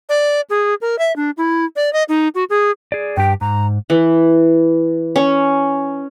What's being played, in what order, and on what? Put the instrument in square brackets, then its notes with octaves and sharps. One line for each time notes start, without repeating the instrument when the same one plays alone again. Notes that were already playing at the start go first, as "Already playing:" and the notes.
[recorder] D5
G#4
A#4
E5
D4
E4
D5
D#5
D#4
F#4
G#4
[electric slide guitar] G#4 D5
[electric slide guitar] G2 G4 [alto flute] G5
[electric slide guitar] G#2 [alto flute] A#5
[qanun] E3
C#4